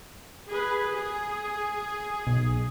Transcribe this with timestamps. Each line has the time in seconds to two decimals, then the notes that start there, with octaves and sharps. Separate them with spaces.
0.48 G#4 B4
0.95 G#4
2.27 B1